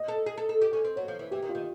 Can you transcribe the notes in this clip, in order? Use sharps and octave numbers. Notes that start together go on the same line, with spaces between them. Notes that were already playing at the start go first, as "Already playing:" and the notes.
Already playing: D#5
A4
G#4
A4
A4
G4
C#4
C4
F#3 C#5
F3
E3
E3 G4
D#3
F4
D#3